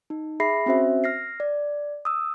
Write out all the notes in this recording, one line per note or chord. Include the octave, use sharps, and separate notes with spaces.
D#4
G#4 E5 B5 A#6 C7
C4 C#4 F#4 C5 E5
F6 A#6 C7
D5
D#6 E6